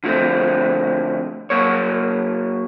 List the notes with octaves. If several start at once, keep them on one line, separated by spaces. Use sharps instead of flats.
D3 F3 A3 C4
F#3 A#3 C#5